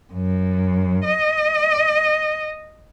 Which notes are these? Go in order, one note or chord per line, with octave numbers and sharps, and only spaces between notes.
F#2
D#5